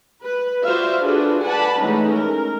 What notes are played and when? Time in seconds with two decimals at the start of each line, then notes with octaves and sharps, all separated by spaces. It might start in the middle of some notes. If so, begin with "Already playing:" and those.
0.23 B4
0.63 F4 F#4 C5 D5 E5 F5
1.02 D4 F4 F#4 G#4 A4 B4
1.44 B4 D5 F#5 G#5 A5 B5
1.78 E3 G#3 A3 C#4 D#4 B4
2.13 A#4